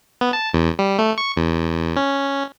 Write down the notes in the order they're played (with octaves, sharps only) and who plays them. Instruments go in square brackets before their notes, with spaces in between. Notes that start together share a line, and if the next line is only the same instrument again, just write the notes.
[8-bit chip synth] B3
A5
E2
G3
A3
C#6
E2
C#4